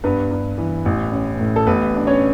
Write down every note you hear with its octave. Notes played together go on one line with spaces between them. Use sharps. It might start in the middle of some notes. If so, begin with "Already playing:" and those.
G2 B3 B4
G2
E3
A1
C#4
A2
A4
A1 B3 B4
D4
C#4 C#5